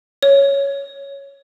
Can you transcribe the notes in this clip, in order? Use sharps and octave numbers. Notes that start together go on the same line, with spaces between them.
C#5